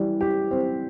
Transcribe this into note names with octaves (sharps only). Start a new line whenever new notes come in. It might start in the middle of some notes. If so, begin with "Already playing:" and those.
Already playing: E3 G3
G4
C4